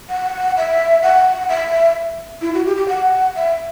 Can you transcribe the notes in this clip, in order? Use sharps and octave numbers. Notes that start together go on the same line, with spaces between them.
F#5
E5
F#5
E5
E4
F#4
G4
G4
F#5
E5